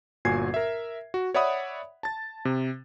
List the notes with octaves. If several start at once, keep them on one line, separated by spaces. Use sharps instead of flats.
G1 A#2 F#4 G#5 G#6 C7
A#4 E5
F#4
C#5 D5 E5 F#5 B5 D#6
A5 A6
C3